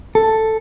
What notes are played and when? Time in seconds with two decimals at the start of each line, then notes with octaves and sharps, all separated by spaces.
0.15 A4